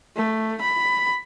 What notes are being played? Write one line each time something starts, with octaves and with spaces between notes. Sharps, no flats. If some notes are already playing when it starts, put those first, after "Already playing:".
A3
B5